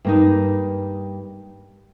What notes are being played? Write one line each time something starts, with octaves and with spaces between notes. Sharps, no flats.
G2 A#3 D#4